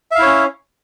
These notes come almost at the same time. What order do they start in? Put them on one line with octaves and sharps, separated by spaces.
E5 F5 E4 C#5 C#4